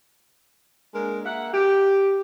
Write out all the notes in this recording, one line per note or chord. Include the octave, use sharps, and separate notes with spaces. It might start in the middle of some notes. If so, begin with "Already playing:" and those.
G#3 A#3 D4 A#4
A#3 E5 F#5
G4